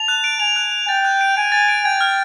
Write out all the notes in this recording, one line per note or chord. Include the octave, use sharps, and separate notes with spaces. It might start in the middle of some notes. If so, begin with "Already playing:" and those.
Already playing: A5 F7
F#6
D7
G#5 F7
F#6
F7
G5 A6
F#6
D7
G#5 D7
A6
D7
G5 G#6
F6